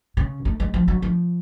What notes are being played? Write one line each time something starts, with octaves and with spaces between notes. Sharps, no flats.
C#3
A3
G#3
F3
F#3
F3